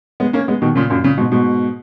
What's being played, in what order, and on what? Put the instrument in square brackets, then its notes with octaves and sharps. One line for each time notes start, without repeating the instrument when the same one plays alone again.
[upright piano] G#3 B3
A#3 C#4
G#3 B3
B2 D#3
A#2 C#3
F#2 A#2
A#2 C#3
G#2 B2
G#2 B2